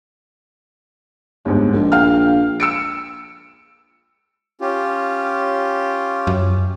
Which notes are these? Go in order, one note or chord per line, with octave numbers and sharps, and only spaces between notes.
G1 D#2 G#2
A#1
F5 G5 F6
E6 C#7 D7
C#4 F4 G4
F#2